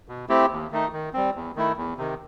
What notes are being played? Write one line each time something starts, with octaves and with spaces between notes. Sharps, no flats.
B2
A3 C4 E4 G4
D#2
D#3 A3 D#4
D#3
G3 C4
E2
D#3 A3 E4
E2
C3 D#3